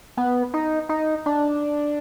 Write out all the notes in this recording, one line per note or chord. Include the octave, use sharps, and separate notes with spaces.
B3
D#4
D#4
D4